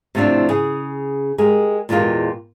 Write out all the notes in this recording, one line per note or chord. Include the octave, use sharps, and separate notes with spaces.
A2 C3 F3 B3 C4 D4
C#3 G#4
G#3 G4 G#4 A#4
E2 A#2 G#3 B3 F4 G4